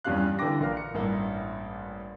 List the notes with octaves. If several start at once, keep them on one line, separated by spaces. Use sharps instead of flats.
E2 G2 C#4 G4 F5 F#6
D3 E3 D4 G5 D6 A#6
A#1 A#4 F5 F6
C#7
A1 G2 A#3 E4 E5